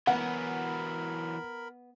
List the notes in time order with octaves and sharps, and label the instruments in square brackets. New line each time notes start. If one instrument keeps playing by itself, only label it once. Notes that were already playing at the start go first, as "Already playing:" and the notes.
[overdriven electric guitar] E3 F#3 [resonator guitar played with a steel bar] B3 [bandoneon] A#4 B5 [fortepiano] F#5